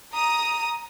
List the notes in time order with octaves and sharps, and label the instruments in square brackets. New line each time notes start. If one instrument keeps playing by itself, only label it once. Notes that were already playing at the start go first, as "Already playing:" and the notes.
[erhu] A#5 [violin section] D#6